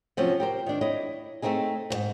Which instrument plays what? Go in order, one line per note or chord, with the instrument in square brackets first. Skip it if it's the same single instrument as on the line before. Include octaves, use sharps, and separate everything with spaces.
[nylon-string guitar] C3 F3 F#3 C#4
G4 A#4 C5
D#3 D4
E4 C#5 D#5
A3 A#3 C4 D#4 G#4
D#2 G#2